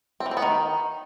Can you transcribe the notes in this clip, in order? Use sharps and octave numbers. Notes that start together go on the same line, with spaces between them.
C4
E3
C4
B3
D#3